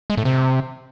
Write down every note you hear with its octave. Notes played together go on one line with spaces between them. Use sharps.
G#3
A2
C3